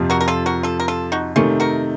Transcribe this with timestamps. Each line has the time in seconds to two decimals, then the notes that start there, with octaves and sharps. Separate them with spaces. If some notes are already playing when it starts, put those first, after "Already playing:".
Already playing: F2 C3 F3
0.10 F#4 A#4
0.20 A#4
0.28 F4 A4
0.46 F#4 A#4
0.63 F4 A4
0.80 A#4
0.88 F4 A4
1.12 D#4 F#4
1.36 C3 D#3 A3 C#4 F4
1.60 F#4 A#4